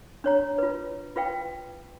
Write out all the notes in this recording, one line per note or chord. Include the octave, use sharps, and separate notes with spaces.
D4 C#5 A#5
F4 B4
F4 B4 F5 G5